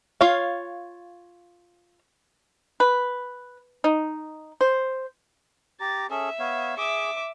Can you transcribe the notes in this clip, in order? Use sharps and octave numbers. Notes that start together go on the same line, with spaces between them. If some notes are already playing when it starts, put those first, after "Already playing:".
F4 C#5 F5
B4
D#4
C5
G4 A#5 A6
C#4 G#4 A4 E5
B3 C#5 F5
G#4 E5 D6